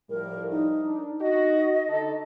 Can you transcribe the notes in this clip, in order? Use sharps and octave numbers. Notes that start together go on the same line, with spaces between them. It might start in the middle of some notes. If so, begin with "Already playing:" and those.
A2 F3 G3 A#4
D#4
D4
D#4 F#4 D#5
D3 D#4 A4